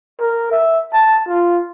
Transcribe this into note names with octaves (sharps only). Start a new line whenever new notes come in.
A#4
E5
A5
F4